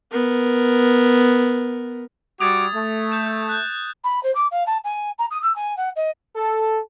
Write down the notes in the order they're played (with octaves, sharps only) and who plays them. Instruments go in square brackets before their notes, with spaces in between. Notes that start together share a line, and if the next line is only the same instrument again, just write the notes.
[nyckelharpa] B3 A#4
[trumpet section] G3 F#4 D6 [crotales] D#6 G#6 A6
[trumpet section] A3
[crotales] G6 E7
F#6 G6
[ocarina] B5
C5
D6
F5
A5
G#5
A#5
D#6
E6
G#5
F#5
D#5
[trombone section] A4